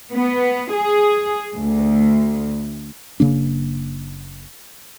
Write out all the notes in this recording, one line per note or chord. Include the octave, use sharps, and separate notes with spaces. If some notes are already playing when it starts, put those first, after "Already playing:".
B3
G#4
D2
F#1 C#3 A#3 D4